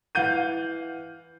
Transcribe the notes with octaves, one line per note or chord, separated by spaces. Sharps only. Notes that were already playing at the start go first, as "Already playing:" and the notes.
E3 F5 F#5 G6 D#7